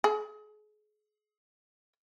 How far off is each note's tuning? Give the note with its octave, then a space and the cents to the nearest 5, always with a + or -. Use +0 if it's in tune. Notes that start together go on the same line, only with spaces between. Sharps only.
G#4 +35